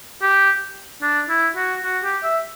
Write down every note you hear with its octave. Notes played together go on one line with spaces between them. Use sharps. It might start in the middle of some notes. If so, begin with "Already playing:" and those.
G4
D4
E4
F#4
F#4
G4
E5